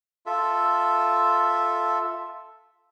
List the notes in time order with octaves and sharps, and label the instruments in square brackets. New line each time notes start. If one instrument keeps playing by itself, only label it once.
[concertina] F4 A4 E5